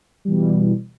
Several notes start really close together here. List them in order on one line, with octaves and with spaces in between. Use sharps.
G3 E3 B2